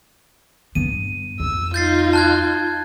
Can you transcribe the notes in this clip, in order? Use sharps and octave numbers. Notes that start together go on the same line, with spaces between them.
G2 B3 D#7
F2 E6
D#4 F4 G6 A6 C7
A5 F#6 G#6